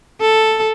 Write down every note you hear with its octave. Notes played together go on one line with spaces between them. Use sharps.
A4